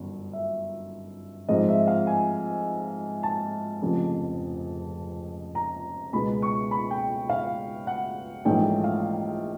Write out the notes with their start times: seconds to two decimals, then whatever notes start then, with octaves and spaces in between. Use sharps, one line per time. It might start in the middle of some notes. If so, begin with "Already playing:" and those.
Already playing: G1 F#2 D#3
0.33 E5
1.48 G#2 F3 G#3 C4 D#5
1.69 E5
1.88 F5
2.07 G#5
3.23 A5
3.82 F1 F2 C#3 F3
5.55 A#5
6.13 C#2 B2 G#3 B3 B5
6.42 C#6
6.71 B5
6.91 G5
7.29 F5
7.87 F#5
8.45 A#1 G#2 E3 A3 C#4 G5
8.84 F5